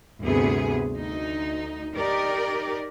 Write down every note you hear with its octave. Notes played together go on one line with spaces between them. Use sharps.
D2 G2 C3 B3 G#4
D2 D#4
D#4 G4 A#4 D5